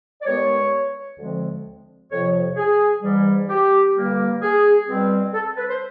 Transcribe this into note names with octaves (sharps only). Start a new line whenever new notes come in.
D5
G2 D#3 G#3 B3 C#5
D2 D3 F3 G#3 C4
F2 C3 F3 C#5
G#4
G#2 E3 G3
G4
G2 D3 G3 A#3
G#4
B2 G3 C4
A4
B4
C5